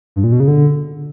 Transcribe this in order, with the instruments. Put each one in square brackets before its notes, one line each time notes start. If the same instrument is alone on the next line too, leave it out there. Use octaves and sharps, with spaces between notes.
[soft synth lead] G2
A#2
B2
C#3
D3